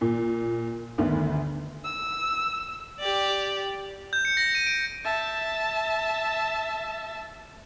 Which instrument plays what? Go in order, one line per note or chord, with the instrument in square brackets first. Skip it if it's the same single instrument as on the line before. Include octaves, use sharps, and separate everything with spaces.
[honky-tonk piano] A#2
G1 D2 D3 D#3
[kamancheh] E6
[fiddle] G4 D5
[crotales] G6
C#7
A#6
D#7
D7
[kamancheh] E5 A5